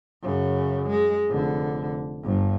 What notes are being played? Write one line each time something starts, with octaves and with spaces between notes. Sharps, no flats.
F#2 C#3
G#3
F1 D3
G1 G2